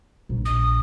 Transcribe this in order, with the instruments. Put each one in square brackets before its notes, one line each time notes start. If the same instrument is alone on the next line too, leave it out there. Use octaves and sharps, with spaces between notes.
[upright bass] A#1
[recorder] D#6